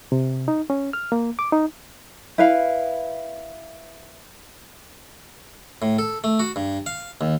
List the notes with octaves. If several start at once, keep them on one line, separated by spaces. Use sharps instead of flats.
C3
D#4
C#4
F6
A#3
D6
D#4
E4 B4 F5
A2
A4
A3
F#4
G2
F5
D#2